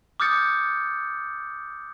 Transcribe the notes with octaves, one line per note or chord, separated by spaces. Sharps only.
D6 D#6 F6 G6 A6 C#7